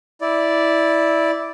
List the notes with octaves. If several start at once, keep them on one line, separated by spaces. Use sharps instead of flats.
E4 D5